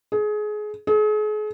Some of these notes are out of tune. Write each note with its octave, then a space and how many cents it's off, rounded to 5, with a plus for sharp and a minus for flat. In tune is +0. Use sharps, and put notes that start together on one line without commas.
G#4 +25
G#4 +40